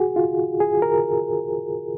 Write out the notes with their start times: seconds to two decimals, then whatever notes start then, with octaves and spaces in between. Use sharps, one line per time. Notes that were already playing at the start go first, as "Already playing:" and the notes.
Already playing: F#4 G#4
0.16 F4
0.60 G#4
0.82 A#4